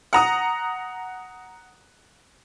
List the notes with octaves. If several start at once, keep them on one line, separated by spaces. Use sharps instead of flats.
F#5 A#5 D#6